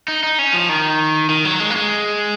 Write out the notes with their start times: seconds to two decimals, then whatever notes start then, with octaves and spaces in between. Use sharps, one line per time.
0.08 D#4
0.24 D#4
0.39 C#4
0.54 F3
0.69 D#3
1.30 D#3
1.45 F#3
1.60 G#3
1.70 A#3
1.76 G#3